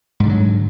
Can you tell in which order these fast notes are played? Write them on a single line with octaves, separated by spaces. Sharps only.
G#2 G3 D3 F#3